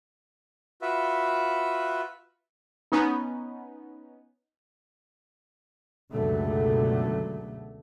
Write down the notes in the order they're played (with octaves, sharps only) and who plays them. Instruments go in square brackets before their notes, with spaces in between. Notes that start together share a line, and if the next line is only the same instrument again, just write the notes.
[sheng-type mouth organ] F4 F#4 B4 E5
[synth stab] B3 C#4 D#4
[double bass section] C#2 F#2 B2 D3 F#3 A3